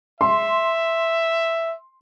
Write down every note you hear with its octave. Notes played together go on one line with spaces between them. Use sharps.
E5 C6